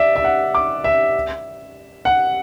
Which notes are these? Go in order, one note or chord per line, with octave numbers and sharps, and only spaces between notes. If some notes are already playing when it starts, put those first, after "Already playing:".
Already playing: D5 E5
E5
F#5
D6
E5
F#5